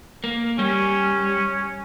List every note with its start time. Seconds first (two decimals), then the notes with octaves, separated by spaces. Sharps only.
0.24 A#3
0.59 G3 C#4